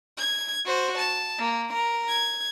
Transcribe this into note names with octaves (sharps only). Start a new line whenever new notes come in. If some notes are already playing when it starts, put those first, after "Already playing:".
G#6
F#4 C5
A5
A#3
A#4
G#6